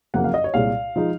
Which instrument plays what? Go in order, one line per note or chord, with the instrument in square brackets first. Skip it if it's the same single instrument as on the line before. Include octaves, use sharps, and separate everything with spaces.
[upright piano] F#1 F2 C#3 F#3 A#3 F#5
F5
D#5
C#5
C2 A#2 G#3 F5
F3 G#3 D#4